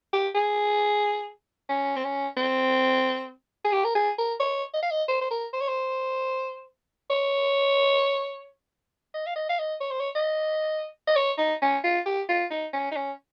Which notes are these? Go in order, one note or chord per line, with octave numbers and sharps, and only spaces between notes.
G4
G#4
C#4
C4
C#4
C4
G#4
G4
A#4
G#4
A#4
C#5
D#5
F5
D#5
C5
C5
A#4
C5
C#5
C5
C#5
D#5
F5
D#5
F5
D#5
C#5
C5
C#5
D#5
D#5
C#5
D#4
C#4
F4
G4
F4
D#4
C#4
D#4
C#4